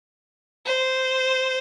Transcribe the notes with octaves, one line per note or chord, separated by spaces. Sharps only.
C5